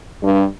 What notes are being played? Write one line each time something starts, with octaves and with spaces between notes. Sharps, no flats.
G2